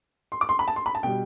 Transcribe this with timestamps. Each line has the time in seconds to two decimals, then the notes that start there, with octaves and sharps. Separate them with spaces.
0.32 C6
0.41 D6
0.49 C6
0.59 B5
0.68 A5
0.76 C6
0.86 B5
0.95 A5
1.03 B2 G3 G5